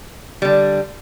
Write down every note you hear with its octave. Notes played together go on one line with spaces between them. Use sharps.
D3 G3